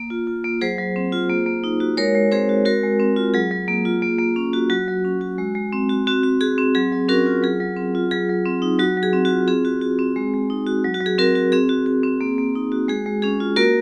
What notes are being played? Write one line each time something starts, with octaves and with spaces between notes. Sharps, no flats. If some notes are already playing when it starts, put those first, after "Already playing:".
Already playing: A#3
F4
F4
A#3
F#3 G#4 C5
F#3
C4
F4
A#3
A#3
D#4
F#4
G#3 A#4 C#5
G#3
C4 G#4 C5
F#4
G#3 F#4 A#4
G#3
C4
F4
F#3 G#4
F#3
A#3
F4
A#3
A#3
C#4
F#4
F#3 F#4
F#3
C#4
F#4
G#3
G#3
C4
F#4
C4 F#4
F#4
F#4 G#4
C4
F#3 G#4
F#3
C#4 F#4 A#4
F4
F#3 G#4
F#3
C4
F4
F#3 G#4
F#3
C4
D#4
F#3 F#4
F#3
G#4
C4
F#4
F4
C4 G#4
F#4
F#4
C4
G#3
G#3
D#4
F#4
F#3
F#4
F#3
G#4
C4 F#4 A#4
F#4
C4 G#4
F#4
F#4
C4
A#3
A#3
D#4
F#4
G#3 G#4
G#3
C#4 G#4
F4
A#3 F#4 A#4